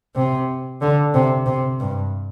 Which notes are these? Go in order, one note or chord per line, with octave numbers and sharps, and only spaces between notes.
C3
D3
C3
C3
G2